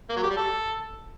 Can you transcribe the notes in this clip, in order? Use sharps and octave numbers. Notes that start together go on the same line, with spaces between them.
A#3
F#3
G4
G3
A4